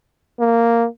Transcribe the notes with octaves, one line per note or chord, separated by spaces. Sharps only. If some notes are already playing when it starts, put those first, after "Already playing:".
A#3